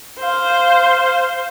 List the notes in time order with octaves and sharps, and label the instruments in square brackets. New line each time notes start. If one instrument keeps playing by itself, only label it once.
[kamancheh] C5 F5